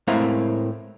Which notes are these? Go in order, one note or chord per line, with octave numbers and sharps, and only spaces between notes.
A2 G#3 C4 E4 A#4 F5